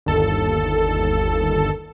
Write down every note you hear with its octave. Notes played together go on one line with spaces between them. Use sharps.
G1 D#2 A4